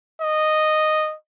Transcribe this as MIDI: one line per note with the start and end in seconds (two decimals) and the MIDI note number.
0.22 1.15 75